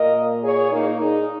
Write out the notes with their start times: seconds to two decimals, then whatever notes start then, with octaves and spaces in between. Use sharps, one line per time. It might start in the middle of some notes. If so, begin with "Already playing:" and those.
Already playing: A#2 A#3 A#4 D#5
0.43 G#4 C#5
0.72 A#3 D#4
1.00 D#4 G#4